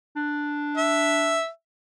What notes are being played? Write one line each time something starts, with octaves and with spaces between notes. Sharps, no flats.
D4
E5